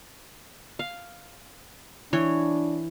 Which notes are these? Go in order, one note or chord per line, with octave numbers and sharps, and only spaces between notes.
F5
E3 D4 C#5